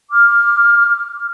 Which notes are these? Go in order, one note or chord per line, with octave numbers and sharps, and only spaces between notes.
D6 F6